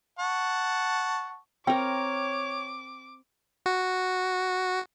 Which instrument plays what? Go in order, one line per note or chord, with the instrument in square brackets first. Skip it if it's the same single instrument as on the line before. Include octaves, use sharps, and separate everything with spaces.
[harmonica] F#5 A5 C#6
[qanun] C4 A#4 [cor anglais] C#5 [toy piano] G5 [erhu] D6
[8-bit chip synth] F#4